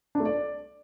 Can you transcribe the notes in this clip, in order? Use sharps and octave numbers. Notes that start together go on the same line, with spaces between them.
D4
A3
D5